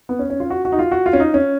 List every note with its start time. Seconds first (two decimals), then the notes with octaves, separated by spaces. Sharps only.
0.09 B3
0.19 C#4
0.30 C#4
0.40 F4
0.50 F#4
0.65 F#4
0.72 D#4
0.79 F4
0.91 F#4
1.06 F4
1.13 C#4
1.20 D#4
1.34 C#4